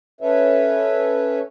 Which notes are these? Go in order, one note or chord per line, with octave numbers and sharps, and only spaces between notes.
C#4 A4 B4 C#5 E5